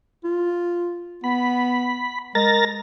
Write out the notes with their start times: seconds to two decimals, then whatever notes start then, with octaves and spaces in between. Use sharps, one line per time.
0.24 F4
1.24 B3 B5
2.35 G#3 A#4 A6 A#6